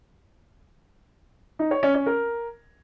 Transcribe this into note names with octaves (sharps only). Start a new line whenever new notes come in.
D#4
C#5
C#4
C#4
A#4